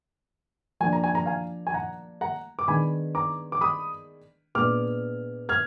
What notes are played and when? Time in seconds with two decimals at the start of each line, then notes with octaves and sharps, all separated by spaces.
0.80 F3 A#3 D4 G#5
0.93 A#5
1.04 G#5
1.15 A#5
1.26 F5 G#5
1.67 G#5
1.74 F#5 A#5
2.21 F#5 A#5
2.59 D6
2.68 D#3 G#3 B3 D4 G#5 B5
3.15 A#5 D6
3.52 D6
3.61 B5 D#6
4.55 A#2 G#3 B3 D4 D6 F6
5.49 F6 G#6